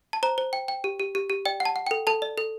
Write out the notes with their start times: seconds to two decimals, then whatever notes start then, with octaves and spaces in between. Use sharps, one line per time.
0.13 A5
0.23 C5 A#5
0.38 C5
0.53 G5
0.68 G5
0.84 G4
0.99 G4
1.15 G4
1.30 G4
1.45 D5 G5
1.60 F#5
1.65 A5
1.76 F#5
1.87 G5
1.91 A4
2.07 A4 A5
2.22 D5
2.38 A4